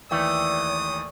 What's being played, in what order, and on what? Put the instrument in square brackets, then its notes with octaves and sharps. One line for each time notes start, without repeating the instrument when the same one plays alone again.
[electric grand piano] D#2 E3 G5 [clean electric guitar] A3 [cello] D5 [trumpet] D#6